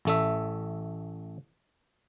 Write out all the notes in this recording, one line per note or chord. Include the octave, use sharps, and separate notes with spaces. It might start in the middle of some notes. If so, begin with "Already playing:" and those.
A1 A3 E5